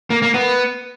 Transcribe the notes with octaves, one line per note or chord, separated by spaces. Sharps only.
A#3
A#3
B3